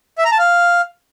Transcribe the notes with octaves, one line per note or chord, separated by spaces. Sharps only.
E5
A#5
A5
F5